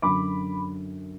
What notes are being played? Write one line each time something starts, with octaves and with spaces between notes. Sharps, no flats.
F#2 D3 F#3 B5 D6